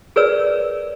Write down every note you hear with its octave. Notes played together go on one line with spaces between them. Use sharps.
G#4 A#4 B4 C#5 D5 E6